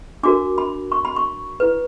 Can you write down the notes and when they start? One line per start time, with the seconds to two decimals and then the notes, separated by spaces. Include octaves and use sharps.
0.23 D4 F#4 A#4 D6
0.58 B5
0.92 C#6
1.05 B5
1.16 C#6
1.60 E4 B4